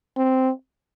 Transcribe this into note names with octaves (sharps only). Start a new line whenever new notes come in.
C4